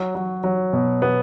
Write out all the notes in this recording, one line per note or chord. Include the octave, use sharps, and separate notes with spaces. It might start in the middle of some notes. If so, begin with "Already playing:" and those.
Already playing: F#3
F#3
F#3
B2
B3